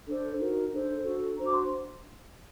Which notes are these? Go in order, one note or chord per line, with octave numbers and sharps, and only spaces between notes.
D4 A4 C5
D#4 F#4 A#4
D4 A4 C5
D4 F#4 A4
D4 F#4 C5 A#5
D6
C6